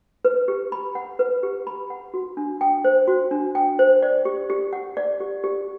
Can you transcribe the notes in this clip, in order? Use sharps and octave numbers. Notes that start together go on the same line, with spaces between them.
B4
G4
B5
F#5
B4
G4
B5
F#5
F#4
D4
G5
C5
F#4
D4
G5
C5
D5
G4
G4
F#5
D5
G4
G4